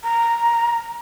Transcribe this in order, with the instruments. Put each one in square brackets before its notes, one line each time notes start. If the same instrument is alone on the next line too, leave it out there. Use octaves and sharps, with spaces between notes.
[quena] A#5